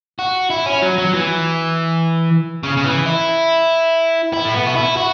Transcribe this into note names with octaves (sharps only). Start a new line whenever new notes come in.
F#4
E4
C#4
F#3
F#3
E3
C#3
C#3
E3
E4
E4
A3
B3
F#4
E4
F#4